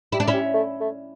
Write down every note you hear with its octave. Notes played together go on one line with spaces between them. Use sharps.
G3 E4
D4
C#4 E4
G3
A3
A3